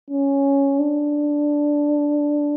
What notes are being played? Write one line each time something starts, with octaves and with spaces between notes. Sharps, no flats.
C#4
D4